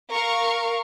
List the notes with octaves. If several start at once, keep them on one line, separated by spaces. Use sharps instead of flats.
A#4 F5 C#6